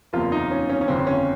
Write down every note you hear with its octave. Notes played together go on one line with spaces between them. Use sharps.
F#1 E2 C3 F3 A#3 F4
D#4
C#4
C#4
C#4
G1 F2 C#3 C4
C#4